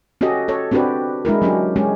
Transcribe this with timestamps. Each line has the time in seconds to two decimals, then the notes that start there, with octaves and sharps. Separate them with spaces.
0.21 C#4 F#4 G4 A4 D#5
0.48 A4 C#5
0.72 C4 D4 F#4 G4 B4
1.25 G#3 D4 E4 A#4
1.42 F#3 C#4 D4 G4
1.76 G#3 C#4 G4